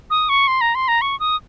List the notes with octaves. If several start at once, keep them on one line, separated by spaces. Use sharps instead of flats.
D#6
C#6
C6
A#5
C6
A#5
C#6
D#6